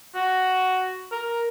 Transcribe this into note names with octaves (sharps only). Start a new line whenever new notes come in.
F#4
A#4